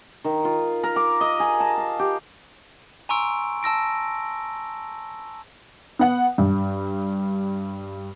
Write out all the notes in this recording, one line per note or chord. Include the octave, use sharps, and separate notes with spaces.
D#3
F4
A#4
D6
D#5
G#4
A5
F5
G4
G#5 A#5 C6 C#6 E6 D7
A5 E6 A#6 D7
B3 F#5
G2